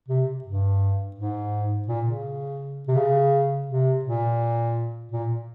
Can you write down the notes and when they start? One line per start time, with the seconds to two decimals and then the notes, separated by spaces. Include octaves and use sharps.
0.08 C3
0.44 G2
1.16 G#2
1.87 A#2
2.05 C#3
2.88 C3
2.96 C#3
3.68 C3
4.05 A#2
5.12 A#2